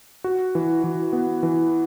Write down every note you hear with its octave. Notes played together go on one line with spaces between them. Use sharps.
F#4
E3
E3
B3
E3